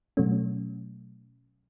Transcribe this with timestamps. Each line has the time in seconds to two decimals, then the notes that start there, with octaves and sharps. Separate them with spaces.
0.17 B2 F#3 A3 C#4